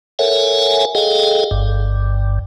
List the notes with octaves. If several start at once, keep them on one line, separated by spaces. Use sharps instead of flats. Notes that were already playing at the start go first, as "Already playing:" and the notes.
A4 A#4 C#5 E5 F#5 G#5
G#4 A4 D#5 F5 G5
G1 G2